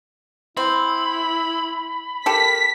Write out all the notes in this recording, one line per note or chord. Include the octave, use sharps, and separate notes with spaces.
C4 E4 B5
G4 A4 A#4 B6